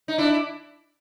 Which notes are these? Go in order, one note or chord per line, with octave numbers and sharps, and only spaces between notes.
D#4
D4 E4